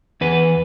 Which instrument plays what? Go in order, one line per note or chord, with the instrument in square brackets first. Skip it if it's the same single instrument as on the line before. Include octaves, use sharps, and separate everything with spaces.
[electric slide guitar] E2 B4